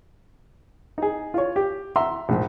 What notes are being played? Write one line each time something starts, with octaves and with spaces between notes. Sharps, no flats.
D#4 G#4
F4 C#5
G4
E5 F#5 A#5 C6 E6
A#1 G#2